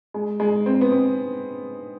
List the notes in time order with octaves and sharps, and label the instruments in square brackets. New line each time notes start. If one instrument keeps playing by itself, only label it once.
[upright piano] G#3
G#3
C4
B3
C4